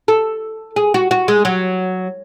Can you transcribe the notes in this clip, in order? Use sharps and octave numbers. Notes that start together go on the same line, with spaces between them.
A4
G#4
F#4
F#4
G#3
F#3